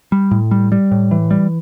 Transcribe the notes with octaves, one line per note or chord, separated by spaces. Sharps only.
G3
A2
G3
G3
A2
E3
G3